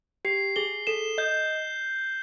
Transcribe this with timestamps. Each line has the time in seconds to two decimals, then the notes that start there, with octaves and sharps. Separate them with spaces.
0.25 G4 C7
0.56 G#4 G7
0.87 A4 E7
1.18 D#5 G6